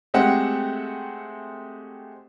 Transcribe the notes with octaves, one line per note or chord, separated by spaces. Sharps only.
G#3 A3 C4 G4 F#5